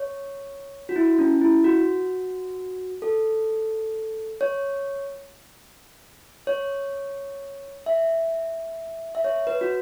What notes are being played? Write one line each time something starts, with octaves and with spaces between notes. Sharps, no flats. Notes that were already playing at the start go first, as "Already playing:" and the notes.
Already playing: C#5
F#4
E4
C#4
E4
F#4
A4
C#5
C#5
E5
E5
C#5
B4
F#4